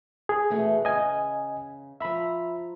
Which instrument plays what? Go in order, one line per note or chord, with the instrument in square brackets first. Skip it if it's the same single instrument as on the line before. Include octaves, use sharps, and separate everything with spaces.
[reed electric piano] G#4
[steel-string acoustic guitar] B2 E3 A3
[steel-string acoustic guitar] C#3 [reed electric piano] D#5 G#5
[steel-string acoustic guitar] F3 A#5 [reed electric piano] E5 B5